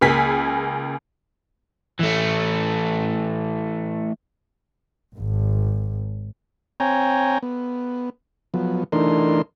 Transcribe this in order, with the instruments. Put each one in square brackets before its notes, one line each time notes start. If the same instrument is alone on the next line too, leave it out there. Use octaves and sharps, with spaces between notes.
[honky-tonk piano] C#2 A#3 G#4 G#5 B6
[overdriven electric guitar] E3 A3
[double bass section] G#1
[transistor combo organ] C4 C#5 G5 G#5 A#5
B3
F3 F#3 B3
E3 A3 D4 D#4 A#4 C6